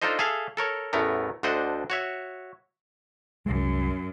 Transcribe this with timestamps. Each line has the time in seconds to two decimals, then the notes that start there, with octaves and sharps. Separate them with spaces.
0.02 D4 D#4 F4 A4 C5 D#5
0.19 G#4 A4 E5 F5
0.57 A4 A#4 C#5
0.93 A1 E2 A3 B3 A#4
1.43 D2 D3 D4 C5 D#5 F#5
1.90 F#4 C#5 E5
3.46 C2 F#2 G#3